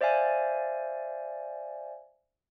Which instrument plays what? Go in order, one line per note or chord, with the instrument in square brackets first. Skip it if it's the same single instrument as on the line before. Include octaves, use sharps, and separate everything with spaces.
[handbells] C5 D5 E5 F5 G#5 A6